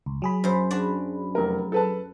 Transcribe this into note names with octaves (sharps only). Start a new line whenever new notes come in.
C#2
F#3 G#4 B5
F#2 C5
D4 F#4 D5
F1 A#4
A4 B4 A5